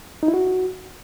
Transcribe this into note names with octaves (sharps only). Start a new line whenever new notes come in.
D#4
E4
F#4